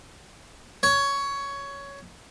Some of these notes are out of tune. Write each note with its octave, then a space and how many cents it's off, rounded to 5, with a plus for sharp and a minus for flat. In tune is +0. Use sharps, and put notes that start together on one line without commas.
C#5 +10